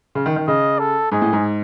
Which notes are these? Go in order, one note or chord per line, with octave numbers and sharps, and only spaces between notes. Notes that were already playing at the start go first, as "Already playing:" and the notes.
C#3
D#3
D#3
C#3 D#5
A4
G#2 G#4
A2
G#2